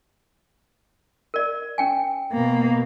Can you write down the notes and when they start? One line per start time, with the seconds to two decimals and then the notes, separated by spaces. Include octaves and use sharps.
1.34 A#4 D5
1.78 C#4 G5 G#5
2.32 B2 A#3